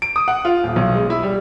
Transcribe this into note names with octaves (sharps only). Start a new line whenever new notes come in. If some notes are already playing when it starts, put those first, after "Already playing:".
D7
D#6
F#5
F4
D#1
B1
G#3
E4
G3